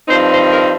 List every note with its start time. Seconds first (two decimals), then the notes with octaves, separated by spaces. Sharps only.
0.08 G2 F3 C4 D#4 C5
0.30 C5
0.51 A#4